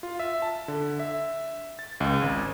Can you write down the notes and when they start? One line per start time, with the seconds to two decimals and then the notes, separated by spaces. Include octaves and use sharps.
0.03 F4
0.19 E5
0.42 A5
0.68 D3
1.00 E5
1.79 A6
2.00 C#2
2.22 G#1